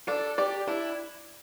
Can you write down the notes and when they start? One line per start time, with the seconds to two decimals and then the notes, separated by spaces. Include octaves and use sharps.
0.08 D4 A4
0.38 G4 D5
0.68 D4 E4